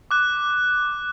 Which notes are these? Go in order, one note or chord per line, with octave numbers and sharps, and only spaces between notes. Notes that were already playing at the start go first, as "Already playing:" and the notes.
D6 F#6